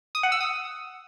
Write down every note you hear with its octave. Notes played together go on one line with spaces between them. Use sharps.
D#6
F#5
E6
D#6